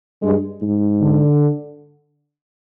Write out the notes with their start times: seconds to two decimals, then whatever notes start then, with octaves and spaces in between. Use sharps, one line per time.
0.23 G2 G#3
0.62 G#2
1.01 D3